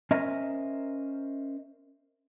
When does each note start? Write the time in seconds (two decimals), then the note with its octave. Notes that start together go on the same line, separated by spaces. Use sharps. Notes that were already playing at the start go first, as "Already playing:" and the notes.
0.11 C#4 A#4 C5 D#5 E5 A#5